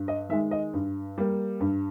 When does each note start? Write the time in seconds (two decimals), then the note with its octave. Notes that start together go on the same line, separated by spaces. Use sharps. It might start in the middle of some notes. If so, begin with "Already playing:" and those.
Already playing: G2
0.08 D#5
0.29 D#3 E5
0.33 G#3
0.51 D#5
0.73 G2
1.18 G3 A#3
1.60 G2